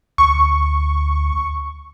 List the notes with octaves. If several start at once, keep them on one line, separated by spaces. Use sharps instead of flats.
D2 C#6